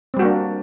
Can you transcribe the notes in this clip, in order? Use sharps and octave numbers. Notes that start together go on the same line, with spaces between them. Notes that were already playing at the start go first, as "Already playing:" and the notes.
G3 A#3 C4 D4 F#4